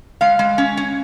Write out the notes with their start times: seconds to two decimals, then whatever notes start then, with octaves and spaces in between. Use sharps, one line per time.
0.21 G#3 F5
0.39 G#3
0.58 C#4
0.77 C#4